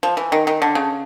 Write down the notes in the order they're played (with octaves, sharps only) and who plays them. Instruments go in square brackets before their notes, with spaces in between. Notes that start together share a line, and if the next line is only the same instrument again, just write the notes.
[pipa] F3
E3
D#3
D#3
D3
C#3